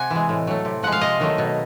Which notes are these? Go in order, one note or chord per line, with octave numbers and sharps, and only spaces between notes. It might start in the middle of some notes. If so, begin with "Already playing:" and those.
Already playing: C3 F#5 G#5
E3 G#3
A2
F#3 A3
C3
F3 G#3 F#5
F5
C3 D#5
D#3 F#3 A3
B2